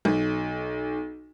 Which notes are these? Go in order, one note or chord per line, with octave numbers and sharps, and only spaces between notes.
B1